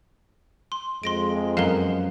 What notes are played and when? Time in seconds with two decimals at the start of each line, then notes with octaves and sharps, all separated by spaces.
0.72 C6
1.03 F2 G#3 C6 A#6 D7
1.57 F#2 B3 F5 G7